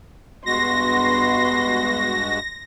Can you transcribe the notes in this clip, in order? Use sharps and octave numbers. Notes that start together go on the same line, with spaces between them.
G2 G#3 B3 F#4 C6 A#6